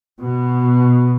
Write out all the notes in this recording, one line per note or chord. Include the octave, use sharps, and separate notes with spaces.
B2